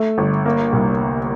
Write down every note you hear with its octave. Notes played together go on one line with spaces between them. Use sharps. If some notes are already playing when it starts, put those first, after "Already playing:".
Already playing: A3
G1
A#3
C2